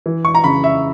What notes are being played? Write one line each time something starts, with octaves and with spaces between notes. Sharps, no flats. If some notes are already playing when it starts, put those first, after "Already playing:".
E3
C#6
A#5
C#3 B5
E5